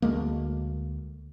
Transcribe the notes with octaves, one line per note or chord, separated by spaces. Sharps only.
D2 G#3 A#3